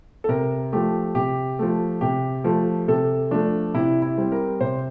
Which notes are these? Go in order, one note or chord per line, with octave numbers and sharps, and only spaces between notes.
A4
C3 A#4
F3 A3 G4
C3 G4
F3 A3
C3 G4
F3 A3
C3 A4
F3 A3 D4
C3 E4
E4
G3 C4
A#4
C3 C5